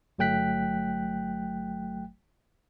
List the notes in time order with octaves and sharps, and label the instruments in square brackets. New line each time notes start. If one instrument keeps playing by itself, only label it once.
[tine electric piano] G1 F#3 A3 G5 F#6 B6